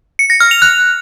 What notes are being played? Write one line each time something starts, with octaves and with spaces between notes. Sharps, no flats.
C#7
A#6
F6
F7
F#6